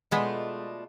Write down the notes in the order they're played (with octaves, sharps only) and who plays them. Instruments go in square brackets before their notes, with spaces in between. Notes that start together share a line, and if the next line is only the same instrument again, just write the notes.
[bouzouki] B2 A3 D4 F4 [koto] G#3 B3